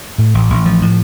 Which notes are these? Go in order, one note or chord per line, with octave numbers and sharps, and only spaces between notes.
A2
A1
A1
F3
A2